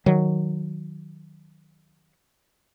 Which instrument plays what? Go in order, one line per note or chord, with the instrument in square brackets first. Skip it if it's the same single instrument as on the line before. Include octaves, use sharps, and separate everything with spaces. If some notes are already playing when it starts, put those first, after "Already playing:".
[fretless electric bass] D#3 F#3